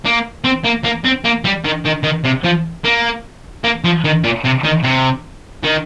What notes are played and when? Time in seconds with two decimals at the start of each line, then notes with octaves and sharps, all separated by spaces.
0.05 A#3
0.44 C4
0.65 A#3
0.84 A#3
1.05 C4
1.24 A#3
1.44 G3
1.65 D#3
1.85 D#3
2.04 D#3
2.24 C3
2.45 F3
2.85 A#3
3.64 A#3
3.84 F3
4.04 D#3
4.24 A#2
4.44 C3
4.64 D#3
4.83 C3
5.64 D#3